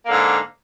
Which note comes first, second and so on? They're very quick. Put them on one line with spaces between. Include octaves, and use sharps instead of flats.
A#3 D3 G#2